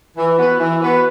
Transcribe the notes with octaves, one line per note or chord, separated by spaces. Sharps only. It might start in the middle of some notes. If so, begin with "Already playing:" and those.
E3
B3 F#4 B4
E3
B3 F#4 B4